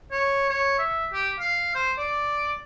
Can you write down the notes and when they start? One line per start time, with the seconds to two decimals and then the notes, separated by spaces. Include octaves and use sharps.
0.11 C#5
0.50 C#5
0.78 E5
1.14 G4
1.40 F5
1.75 C5
1.98 D5